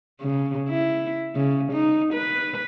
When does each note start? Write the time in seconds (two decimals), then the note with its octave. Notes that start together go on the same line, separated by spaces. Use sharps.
0.20 C#3
0.69 E4
1.35 C#3
1.72 D#4
2.13 B4